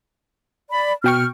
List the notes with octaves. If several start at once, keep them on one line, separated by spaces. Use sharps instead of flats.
D5 B5
B2 G5 C#6 F6